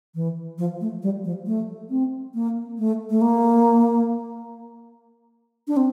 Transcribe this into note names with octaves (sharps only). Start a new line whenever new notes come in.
E3
F3
A3
G3
F3
A3
C4
A#3
A3
A3
A#3
D4
C4